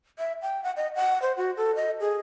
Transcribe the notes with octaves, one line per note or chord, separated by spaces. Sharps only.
E5
G5
F#5
D#5
F#5
C5
F#4
A4
D#5
G#4